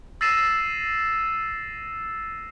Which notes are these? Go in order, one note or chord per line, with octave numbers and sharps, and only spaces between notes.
E6 A6 A#6 C7 D#7 E7